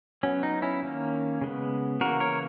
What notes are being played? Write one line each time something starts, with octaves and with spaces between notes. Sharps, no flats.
F#3 B3 C#4
D#4
C#4 E4
D#3 A#3 C#4
C#3 G#3 B3
C#3 E3 A#3 F#4 A#4
A#4 C#5